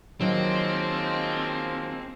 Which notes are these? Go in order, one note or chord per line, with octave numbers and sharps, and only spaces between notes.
D#3 F3 F#3 G#3 A#3 C4